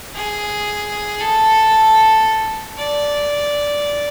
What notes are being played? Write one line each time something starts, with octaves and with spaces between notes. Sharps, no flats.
G#4
A4
D5